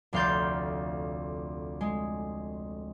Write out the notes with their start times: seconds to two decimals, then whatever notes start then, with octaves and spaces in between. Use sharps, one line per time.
0.13 F1 D2 F5 C6 G6 A6
1.81 G#3